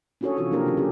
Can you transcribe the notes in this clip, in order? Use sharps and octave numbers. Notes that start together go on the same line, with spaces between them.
C#4 D4 F#4 G#4 A4 C#5
C3 E3 C4 F4 F#4 C#5
F3 A#3 D4 G4 A#4
C#3 F#3 C#4 G4
C#4 G4 A4